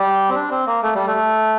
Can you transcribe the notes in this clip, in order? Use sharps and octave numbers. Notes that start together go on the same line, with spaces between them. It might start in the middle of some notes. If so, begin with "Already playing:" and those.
Already playing: G3 G4
C4
D4
C4
A#3
A3
G3
A3